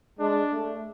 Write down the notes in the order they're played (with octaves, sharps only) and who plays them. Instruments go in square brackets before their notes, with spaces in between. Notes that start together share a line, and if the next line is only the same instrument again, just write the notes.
[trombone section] G#3 [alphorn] D4
[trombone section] A3